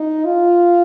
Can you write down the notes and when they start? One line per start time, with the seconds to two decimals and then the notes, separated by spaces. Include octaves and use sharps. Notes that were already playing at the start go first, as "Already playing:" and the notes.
Already playing: D#4
0.25 F4